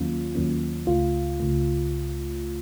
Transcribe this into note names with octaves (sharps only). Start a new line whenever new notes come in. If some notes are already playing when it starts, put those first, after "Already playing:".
Already playing: D#2 D#3 F#3 A#3 C#4 F4
D#2 D#3 F#3 A#3 C#4
C#2 C#3 A3 F4
C#2 C#3 A3